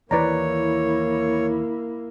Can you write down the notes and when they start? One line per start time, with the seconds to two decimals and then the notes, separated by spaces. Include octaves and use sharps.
0.11 D#2 E3 A#3 E4 B4 C#5 D5 A#5